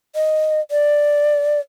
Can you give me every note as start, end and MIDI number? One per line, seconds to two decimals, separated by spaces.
0.16 0.60 75
0.71 1.60 74